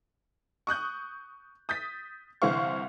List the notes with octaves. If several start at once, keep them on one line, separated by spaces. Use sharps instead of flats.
C#6 D#6 F#6 G6
D#6 G6 A6 B6
G1 C2 E3 C5 F5 C#6